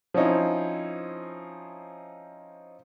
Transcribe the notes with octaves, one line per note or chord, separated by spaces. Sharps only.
F3 C4 C#4 D#4 E4